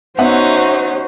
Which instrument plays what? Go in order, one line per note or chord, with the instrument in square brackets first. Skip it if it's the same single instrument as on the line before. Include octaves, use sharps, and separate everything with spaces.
[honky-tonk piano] B3 E5 F#5 [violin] C#4 D#4 [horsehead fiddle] F#4 C5